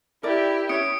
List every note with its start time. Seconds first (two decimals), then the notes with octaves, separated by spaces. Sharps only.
0.23 E4 G4 A#4 D5
0.69 C#4 C#5 D#6 C#7 D7